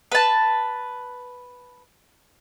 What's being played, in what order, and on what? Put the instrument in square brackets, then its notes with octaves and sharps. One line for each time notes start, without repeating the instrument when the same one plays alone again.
[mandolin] B4 A5